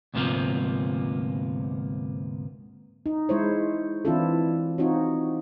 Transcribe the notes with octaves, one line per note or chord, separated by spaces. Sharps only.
D2 G#2 C3 F3 A#3 B3
D#4
G#3 E4 C5 C#5
E3 C4 D4 E4 F4 A4
C4 D#4 F4 F#4 C#5